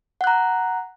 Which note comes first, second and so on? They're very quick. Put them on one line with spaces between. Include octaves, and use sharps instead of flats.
F#5 F#6 A#5